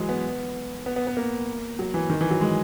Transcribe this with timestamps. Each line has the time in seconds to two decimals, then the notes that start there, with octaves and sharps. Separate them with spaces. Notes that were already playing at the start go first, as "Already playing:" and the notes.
Already playing: E3 F#3 G#3
0.09 B3
0.86 B3
0.96 B3
1.07 B3
1.17 A#3
1.79 F#3
1.94 E3
2.10 D#3
2.21 E3
2.31 F#3
2.41 G#3